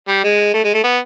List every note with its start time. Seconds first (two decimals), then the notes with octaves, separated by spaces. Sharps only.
0.08 G3
0.24 G#3
0.54 A3
0.64 G#3
0.74 A3
0.84 B3